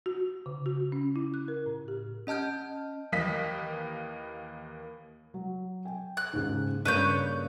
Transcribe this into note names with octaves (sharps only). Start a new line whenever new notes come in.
F#4
C#3
F#4
C#4
E4
F#6
A#4
A2
G4
C#4 D#5 A5 F6 G6
D#2 E3 A#3 D#5 B6
F#3
G5 G#5
F#6
D#2 G#2 C#3
G2 C#3 A#3 B4 C#5 G6